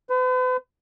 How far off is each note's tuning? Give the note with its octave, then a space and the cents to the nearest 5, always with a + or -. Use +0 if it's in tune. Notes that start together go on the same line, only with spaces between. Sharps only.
B4 +45